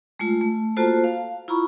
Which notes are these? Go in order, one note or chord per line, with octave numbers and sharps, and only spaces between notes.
G#3 A3 F4
A3
A#3 F4 F#4 A4 C5 A5
F5
E4 F4 A#5 B5 C#6